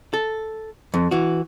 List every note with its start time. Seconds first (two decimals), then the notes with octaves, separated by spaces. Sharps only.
0.14 A4
0.94 F2
1.11 E3 F#4